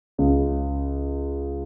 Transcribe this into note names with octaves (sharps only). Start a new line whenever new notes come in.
C#2 C#3